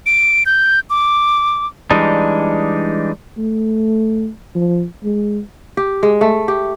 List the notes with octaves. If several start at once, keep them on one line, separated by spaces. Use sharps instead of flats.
D7
G6
D6
E3 G3 G#3 D4 D#4
A3
F3
G#3
G4
G#3
A3
G4